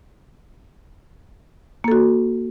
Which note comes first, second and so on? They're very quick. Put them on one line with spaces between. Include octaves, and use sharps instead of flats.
A#3 A4 F#4